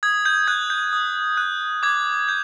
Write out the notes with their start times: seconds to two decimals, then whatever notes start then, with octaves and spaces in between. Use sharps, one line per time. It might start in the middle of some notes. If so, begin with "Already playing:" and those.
0.03 D#6 G#6
0.26 G6
0.48 F#6 G#6
0.70 G6
0.93 D#6
1.37 F#6
1.83 D6 G#6
2.28 G6